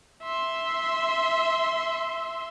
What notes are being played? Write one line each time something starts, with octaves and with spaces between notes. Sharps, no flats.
E5 C6